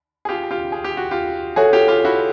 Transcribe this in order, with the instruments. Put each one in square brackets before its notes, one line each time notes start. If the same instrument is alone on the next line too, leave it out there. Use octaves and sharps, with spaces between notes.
[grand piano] G#4
F4 G4
F4 G4
G#4
G4
F#4
F4 G4
[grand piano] F#4 G#4 [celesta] A4 C#5 E5 G#5
[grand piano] F4 G4
F4 G4
E4 F#4